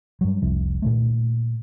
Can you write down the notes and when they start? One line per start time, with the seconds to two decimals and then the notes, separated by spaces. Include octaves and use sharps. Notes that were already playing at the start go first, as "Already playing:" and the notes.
0.21 G2 F#3
0.42 F1 C2 C3 F3
0.82 A#2 D#3 A3